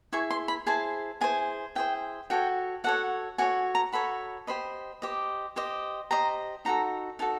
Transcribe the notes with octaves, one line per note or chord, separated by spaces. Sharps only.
E4 G#4 C#6
C6
B5
E4 G#4 C5 A5
E4 G#4 C5 G#5
E4 G#4 C5 G5
F#4 A4 C#5 G5
F#4 A4 C#5 F#5
F#4 A4 C#5 G#5
A#5
F#4 A4 C#5 B5
G4 C5 D#5 B5
G4 C5 D#5
G4 C5 D#5
G4 C5 D#5 A#5
D#4 F#4 A4 A#5
D#4 F#4 A4 A5